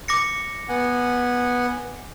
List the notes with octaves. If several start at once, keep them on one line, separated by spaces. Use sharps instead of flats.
D6 A#6 C#7
B3 F#5 G#5